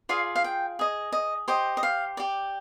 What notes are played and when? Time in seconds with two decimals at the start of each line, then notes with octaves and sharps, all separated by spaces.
0.09 F4 G#4 D5 F5
0.35 F5
0.44 G5
0.79 G#4 D#5
1.12 D#5
1.48 G4 C5 D#5
1.77 D#5
1.83 F5
2.17 G4 D5